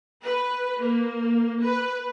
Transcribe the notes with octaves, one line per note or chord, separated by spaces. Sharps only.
B4
A#3
B4